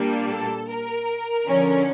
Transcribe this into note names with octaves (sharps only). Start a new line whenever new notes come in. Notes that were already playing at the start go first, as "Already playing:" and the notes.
Already playing: A#2 G3 A#3 D4
A4
A#4
D3 F3 C#4